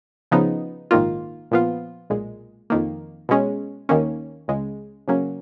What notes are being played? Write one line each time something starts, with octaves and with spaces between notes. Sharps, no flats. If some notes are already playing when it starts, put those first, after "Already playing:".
C#3 F3 B3 D#4
A#1 G#2 D#3 A#3 F4
A#2 F3 B3 F4
B1 A#2 G#3
F2 D#3 A#3
B2 G#3 C#4
D#2 D#3 A#3 C#4
C#2 C#3 G#3
C#3 F#3 A#3 C#4